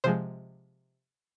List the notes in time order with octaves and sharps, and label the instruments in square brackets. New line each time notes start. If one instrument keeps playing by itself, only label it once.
[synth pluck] C3 F3 G#3 C5